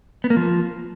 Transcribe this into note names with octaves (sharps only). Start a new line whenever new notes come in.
B3
A#3
F3